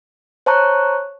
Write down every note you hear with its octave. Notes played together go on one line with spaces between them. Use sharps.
C5 C#5 A5 A#5 C#6 F#6